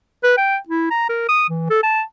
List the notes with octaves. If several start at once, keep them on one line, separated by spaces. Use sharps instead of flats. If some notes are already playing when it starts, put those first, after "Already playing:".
B4
G5
E4
A#5
A#4
D#6
E3
A4
A5